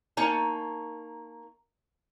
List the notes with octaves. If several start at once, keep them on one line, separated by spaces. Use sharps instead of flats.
A#3 D#4 C#5 G#5 A5